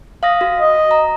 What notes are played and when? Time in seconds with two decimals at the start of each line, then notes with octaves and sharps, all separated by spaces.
0.23 F5 D#6 A#6
0.41 F#4
0.60 D#5
0.91 A#5